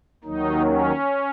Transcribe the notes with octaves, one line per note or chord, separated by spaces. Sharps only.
D#2 D#3 F#3 D#4
C#4